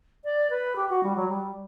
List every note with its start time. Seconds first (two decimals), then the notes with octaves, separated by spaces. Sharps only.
0.24 D5
0.49 B4
0.76 G4
0.89 F#4
1.03 G3
1.15 F#3
1.28 G3